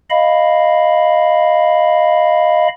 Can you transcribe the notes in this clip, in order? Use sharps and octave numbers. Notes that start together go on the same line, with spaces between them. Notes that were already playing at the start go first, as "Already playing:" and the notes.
D#5 F5 B5